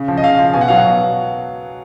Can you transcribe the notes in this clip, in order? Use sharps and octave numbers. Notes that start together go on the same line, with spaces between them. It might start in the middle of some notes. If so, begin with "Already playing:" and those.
Already playing: C#3
F3
D#5
C#3 F5
F3
B2 G#5
F#5
F#3 F5
F#5
B2